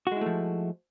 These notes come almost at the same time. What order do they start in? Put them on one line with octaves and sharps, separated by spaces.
F#4 G#3 E4 A3 F3